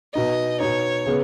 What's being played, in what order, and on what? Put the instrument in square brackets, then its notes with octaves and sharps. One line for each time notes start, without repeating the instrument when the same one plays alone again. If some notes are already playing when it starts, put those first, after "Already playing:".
[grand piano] B2 B3 D#4 [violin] D#5
[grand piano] B2 B3 D#4 [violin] C#5
[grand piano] C#3 B3